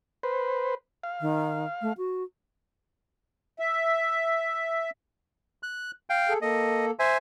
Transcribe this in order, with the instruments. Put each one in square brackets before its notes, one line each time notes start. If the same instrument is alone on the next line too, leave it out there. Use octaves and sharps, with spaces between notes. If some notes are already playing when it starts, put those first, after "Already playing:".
[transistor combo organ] B4 C5
F5
[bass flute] D#3
A3
F#4
[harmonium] E5
[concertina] F#6
F5 G5
[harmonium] G#4 A4
[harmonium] A#3 A4 [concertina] D#5
[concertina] C5 E5 G#5